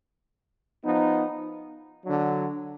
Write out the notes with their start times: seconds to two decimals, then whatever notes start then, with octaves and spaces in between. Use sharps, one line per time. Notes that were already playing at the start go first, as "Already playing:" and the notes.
0.83 F3 B3 D#4
2.04 D3 F#3 D4